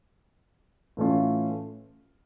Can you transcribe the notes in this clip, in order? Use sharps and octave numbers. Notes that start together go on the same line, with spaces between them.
A2 E3 A3 C#4 F4